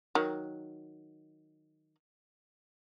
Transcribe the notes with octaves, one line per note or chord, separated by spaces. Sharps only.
D#3 F#3